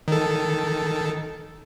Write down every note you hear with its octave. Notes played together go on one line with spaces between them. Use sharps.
D#3 A4